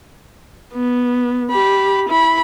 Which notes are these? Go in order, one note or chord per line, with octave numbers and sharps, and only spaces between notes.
B3
G4 B5
E4 B5